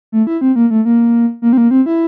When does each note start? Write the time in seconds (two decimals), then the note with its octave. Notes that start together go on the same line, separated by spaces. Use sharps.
0.12 A3
0.27 E4
0.41 C4
0.56 A#3
0.71 A3
0.85 A#3
1.42 A#3
1.53 C4
1.58 A#3
1.71 C4
1.86 E4